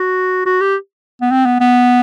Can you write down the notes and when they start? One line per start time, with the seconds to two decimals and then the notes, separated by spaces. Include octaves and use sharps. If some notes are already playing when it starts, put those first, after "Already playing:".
Already playing: F#4
0.46 F#4
0.61 G4
1.22 B3
1.31 C4
1.46 B3
1.60 B3